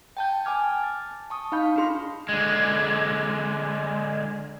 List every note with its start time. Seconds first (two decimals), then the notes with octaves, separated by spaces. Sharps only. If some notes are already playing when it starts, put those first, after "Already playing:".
0.17 G5 A5 G6
0.45 G#5 A5 D6 F6 G#6
0.84 A6
1.30 A5 C#6 D#6
1.52 D#4 F5 B5 G6
1.76 D4 F4 G#4 C6
2.29 D3 G#3